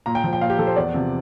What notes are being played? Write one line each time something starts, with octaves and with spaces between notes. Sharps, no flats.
A#2 A#5
G5
F3
G5
A#2 F5
G4
F3 A4
C5
E2 D5
C3 F3